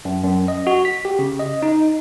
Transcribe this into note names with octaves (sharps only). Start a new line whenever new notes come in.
F#2
F#2
D#5
F#4
B6
G4
C#3
D#5
D#4